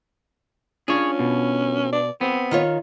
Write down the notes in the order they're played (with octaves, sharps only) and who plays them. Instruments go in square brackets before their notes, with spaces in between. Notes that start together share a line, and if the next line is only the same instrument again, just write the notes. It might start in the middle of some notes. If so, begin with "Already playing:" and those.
[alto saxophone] C#4 [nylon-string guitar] D4 F4 [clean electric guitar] G#4 C#5
[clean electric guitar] B2
[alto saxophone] D5
[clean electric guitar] B3 [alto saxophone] C4
[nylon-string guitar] D#3 F4 C#5